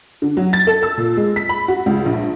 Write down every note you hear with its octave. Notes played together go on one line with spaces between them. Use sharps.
D3
F#3
A6
A4
E6
A#2
G#3
B6
B5
F#4
C#2
A#1